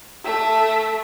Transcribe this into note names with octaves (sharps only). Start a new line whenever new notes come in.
A3 E5